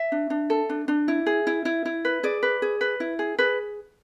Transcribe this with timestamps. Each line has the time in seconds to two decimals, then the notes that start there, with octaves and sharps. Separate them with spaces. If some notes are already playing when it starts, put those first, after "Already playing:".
Already playing: E5
0.12 D4
0.30 D4
0.50 A4
0.70 D4
0.88 D4
1.08 E4
1.26 G#4
1.47 E4
1.65 E4
1.85 E4
2.05 B4
2.23 G#4 D5
2.43 B4
2.62 G#4
2.81 B4
3.00 E4
3.19 G#4
3.39 G#4 B4